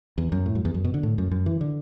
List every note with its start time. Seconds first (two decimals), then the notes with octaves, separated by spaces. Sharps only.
0.18 E2
0.32 F#2
0.46 A2
0.55 F#2
0.65 E2
0.74 F#2
0.84 B2
0.94 D3
1.03 A2
1.18 F#2
1.31 F#2
1.46 E3
1.61 D3